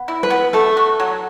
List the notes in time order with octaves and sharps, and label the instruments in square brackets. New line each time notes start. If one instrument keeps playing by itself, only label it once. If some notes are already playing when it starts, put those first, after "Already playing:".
Already playing: [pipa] B3
E4
[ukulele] B4
[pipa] B3
[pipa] A3 [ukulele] A4
[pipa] F#4
F#3